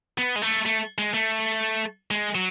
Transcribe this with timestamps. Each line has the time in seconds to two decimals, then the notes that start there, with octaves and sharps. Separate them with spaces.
0.18 B3
0.36 G#3
0.42 A3
0.66 A3
0.98 G#3
1.14 A3
2.11 G#3
2.35 F#3